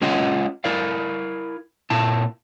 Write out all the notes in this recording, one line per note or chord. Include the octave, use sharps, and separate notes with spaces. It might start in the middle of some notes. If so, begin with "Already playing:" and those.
G#3 C#4 F4 C#5 D#5 F#5
E4 A#4 D5 F5
A#2 E4 A5